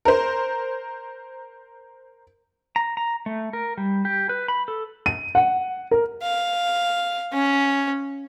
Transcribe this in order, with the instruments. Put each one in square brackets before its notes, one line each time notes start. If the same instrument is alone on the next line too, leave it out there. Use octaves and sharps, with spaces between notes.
[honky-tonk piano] A#4 C5
[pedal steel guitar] A#5
A#5
A3
A#4
G3
G4
B4
B5
A4
[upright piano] D#7
F#5
A#4
[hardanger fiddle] F5
C#4